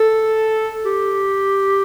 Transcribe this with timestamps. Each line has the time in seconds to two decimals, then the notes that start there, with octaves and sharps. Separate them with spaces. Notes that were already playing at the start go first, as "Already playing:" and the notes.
Already playing: A4
0.86 G4